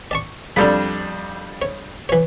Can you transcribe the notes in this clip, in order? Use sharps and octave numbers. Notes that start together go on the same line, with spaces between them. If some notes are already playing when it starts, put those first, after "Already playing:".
D5 A5 C#6
F2 G3 D4 F4 A4 B5
C#5
E3 C#5